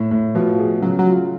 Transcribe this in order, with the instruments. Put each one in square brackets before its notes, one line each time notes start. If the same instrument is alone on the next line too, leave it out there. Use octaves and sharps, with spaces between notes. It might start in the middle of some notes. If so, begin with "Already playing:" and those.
Already playing: [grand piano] A2
A2
[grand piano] B2 [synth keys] F3
[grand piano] G#4
[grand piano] C#3 [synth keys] F#3
[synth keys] F#3
[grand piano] F4